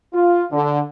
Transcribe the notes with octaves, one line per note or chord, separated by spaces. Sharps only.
F4
D3